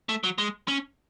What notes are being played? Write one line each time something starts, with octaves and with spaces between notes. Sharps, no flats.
A3
F#3
G#3
C#4